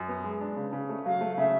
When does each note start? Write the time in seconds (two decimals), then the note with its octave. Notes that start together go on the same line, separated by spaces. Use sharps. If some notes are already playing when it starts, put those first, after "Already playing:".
Already playing: F#2
0.08 B3
0.24 G#3
0.41 D4
0.57 C#3
0.73 C#3
0.89 A3
1.05 F#3 F5
1.21 A3
1.38 C#3 E5